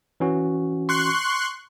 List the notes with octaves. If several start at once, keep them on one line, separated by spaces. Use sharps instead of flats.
E3 C#4 F#4
C6 C#6 F#6